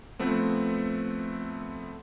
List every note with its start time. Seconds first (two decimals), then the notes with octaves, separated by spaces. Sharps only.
0.19 F3 A3 B3 C4